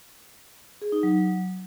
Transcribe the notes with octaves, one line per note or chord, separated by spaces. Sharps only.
G#4
D#4
F#3